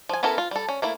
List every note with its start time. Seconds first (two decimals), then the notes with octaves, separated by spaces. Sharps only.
0.09 F3 G#5
0.23 B3 C#4 E4 A4 A#4
0.38 F4
0.51 G3 A4
0.68 C#4
0.82 A3 A#3 E4